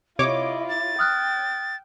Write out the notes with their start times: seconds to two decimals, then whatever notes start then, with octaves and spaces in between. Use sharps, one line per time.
0.19 C3 E4 F4 C#5 D#5 D6
0.69 A6
0.99 G5 D#6 F6 F#6